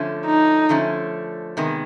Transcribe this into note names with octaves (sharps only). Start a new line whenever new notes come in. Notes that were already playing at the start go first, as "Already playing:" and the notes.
Already playing: D3 F3 A3 C#4
D#4
D3 F3 A3 C#4
C3 D#3 G#3 B3